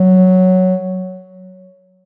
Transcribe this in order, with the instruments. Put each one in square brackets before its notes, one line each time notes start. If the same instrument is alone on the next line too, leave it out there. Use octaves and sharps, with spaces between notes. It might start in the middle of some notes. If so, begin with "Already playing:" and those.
Already playing: [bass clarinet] F#3